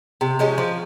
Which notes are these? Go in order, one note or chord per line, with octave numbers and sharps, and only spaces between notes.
C3
F3 G#3 C#4
F3